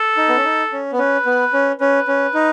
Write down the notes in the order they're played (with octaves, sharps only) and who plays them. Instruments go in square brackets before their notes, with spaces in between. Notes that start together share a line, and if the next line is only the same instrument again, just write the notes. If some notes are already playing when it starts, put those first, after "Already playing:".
Already playing: [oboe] A4
[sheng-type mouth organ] D#4
B3
C#4
D#4
C#4
B3
[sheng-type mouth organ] C#4 [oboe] B4
[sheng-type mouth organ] B3
C#4
[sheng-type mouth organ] C#4 [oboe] B4
[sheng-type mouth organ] C#4
D#4